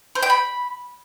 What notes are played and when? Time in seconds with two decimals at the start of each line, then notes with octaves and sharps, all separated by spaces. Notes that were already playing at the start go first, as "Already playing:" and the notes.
0.15 C5
0.23 G5
0.30 B5